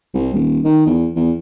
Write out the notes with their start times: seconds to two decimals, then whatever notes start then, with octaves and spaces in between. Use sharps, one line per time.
0.14 C2
0.34 D#1
0.64 D#3
0.86 E2
1.16 E2